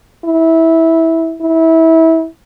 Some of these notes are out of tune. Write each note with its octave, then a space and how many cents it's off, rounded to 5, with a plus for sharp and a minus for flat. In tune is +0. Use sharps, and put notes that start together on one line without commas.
E4 -15
E4 -25